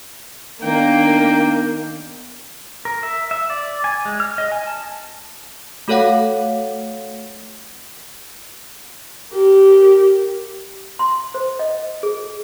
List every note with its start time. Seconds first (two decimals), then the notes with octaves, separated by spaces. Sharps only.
0.63 D#3 A#3 B3 D4 G5
2.85 A#4
3.03 E5
3.31 E5
3.50 D5
3.84 G#5
4.05 G#3
4.20 F6
4.38 D#5
4.52 G#5
4.67 A5
5.88 A3 F#4 A4 C#5 F5 F#5
9.32 G4 A#4
10.99 C6
11.34 C5
11.59 D#5
12.03 G#4